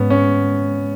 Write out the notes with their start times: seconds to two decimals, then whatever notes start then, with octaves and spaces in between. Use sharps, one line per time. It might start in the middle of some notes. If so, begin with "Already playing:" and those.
Already playing: G#2 B3 C#4
0.10 C#4